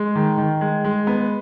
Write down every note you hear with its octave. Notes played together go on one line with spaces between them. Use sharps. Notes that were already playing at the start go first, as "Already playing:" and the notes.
Already playing: G#3
D#3
D#3
G#3
G#3
B3